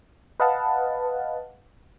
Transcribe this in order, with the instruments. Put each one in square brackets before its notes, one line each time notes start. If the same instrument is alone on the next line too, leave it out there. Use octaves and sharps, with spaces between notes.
[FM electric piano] B4 D#5 F5 F#5 A5